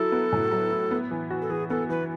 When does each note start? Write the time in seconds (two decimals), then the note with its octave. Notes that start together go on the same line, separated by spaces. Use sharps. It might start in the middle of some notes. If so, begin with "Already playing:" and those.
Already playing: F#3 E4 A4
0.12 B3
0.33 A2
0.51 F#3
0.72 E4
0.91 B3
1.11 E3
1.30 F#4
1.42 A4
1.50 E3 G#4
1.70 B3 A4
1.89 E3 B4